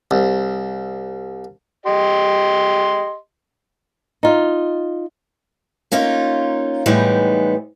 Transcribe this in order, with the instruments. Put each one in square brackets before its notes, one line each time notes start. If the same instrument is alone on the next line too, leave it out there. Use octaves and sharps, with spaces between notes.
[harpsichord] C2
[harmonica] G4 D#5 C6
[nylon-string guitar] D#4 F4
[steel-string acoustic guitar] A#3 C#4 D#4 F4
A2 E3 G3 G#3 B3 D#4